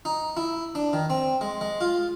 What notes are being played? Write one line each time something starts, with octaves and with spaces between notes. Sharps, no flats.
D#4
E4
D4
D#3
C4
G#3
G#3
F4